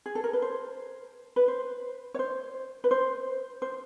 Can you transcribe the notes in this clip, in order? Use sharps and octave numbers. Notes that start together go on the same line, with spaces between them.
G#4
A4
A#4
B4
C5
B4
C5
C#5
C5
B4
C5
C5